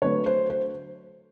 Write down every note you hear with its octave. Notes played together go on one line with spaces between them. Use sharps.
D3 F#3 A3 B4 C#5
C5
C5